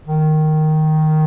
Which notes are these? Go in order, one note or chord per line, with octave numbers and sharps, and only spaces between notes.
D#3